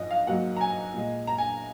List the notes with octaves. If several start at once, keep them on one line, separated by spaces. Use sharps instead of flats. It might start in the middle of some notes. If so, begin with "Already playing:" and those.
Already playing: G#2 F3 D#5
F5
G#2 F#3 A#3 F#5
A#5
G#5
A#2 G#3
A#5
G#5